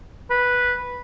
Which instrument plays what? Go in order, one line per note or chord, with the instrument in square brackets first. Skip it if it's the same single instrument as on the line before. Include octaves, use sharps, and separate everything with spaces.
[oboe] B4